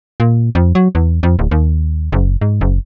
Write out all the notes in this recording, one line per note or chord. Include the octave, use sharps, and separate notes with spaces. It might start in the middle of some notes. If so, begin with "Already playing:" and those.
A#2
F2
F#3
E2
F2
D1
D#2
F#1
G#2
F#1